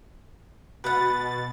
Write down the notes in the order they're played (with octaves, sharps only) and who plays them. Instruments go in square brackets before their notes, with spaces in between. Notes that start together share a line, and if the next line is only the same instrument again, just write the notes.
[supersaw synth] B2 A6 [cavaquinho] B4 F#5